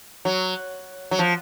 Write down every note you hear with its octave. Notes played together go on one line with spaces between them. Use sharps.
F#3
F#3
F3